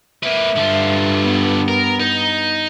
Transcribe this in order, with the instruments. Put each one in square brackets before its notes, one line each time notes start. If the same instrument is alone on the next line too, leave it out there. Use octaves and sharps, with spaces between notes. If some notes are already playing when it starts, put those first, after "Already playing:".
[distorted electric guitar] A#3 B4 [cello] E5
[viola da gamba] G2 [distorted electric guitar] D3 F4
[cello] B3
[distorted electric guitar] A#4
D#4